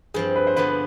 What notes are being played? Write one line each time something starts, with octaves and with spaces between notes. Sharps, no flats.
G2 F3 C4 G#4
B4
C5
G2 D3 F3 B3 D4 B4